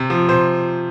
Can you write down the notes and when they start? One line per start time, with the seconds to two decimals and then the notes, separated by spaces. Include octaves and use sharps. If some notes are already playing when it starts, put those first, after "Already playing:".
Already playing: C3
0.10 F3
0.29 C3 C5